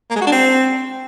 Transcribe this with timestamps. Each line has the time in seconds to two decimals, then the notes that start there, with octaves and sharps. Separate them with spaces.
0.11 A#3
0.16 G#3
0.21 F#4
0.27 D4
0.32 C4